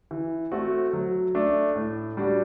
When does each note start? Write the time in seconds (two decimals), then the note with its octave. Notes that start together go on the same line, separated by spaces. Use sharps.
0.11 E3
0.52 A3 C4 F#4
0.93 F#3
1.35 A3 D4
1.76 A2
2.17 G3 D4 F#4